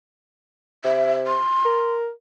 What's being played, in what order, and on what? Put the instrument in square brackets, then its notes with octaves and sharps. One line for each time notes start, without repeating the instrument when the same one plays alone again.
[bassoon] C3 [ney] E5
[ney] C6
[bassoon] A#4